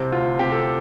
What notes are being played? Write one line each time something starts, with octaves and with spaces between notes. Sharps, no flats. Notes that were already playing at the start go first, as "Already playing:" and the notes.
Already playing: C2 C3 C4
D2 F4
C3 G4
A4